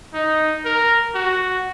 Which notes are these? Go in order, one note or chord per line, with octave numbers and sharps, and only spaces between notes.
D#4
A#4
F#4